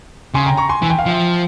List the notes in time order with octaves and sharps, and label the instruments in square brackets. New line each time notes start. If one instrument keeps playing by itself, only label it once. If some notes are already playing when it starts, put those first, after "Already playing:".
[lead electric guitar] C#3 [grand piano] G#5 C6
[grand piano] G5 A#5
A#5 C#6
G#5 C6
[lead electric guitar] E3 [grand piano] G#5
[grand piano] G5
F5
[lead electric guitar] F3 [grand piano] E5 G5